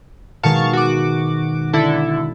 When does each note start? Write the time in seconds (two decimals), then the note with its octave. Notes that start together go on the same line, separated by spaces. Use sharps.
0.43 B2 D#3 G#3 F5 A5 C#6
0.73 F#4 D6
1.73 D3 E4 A4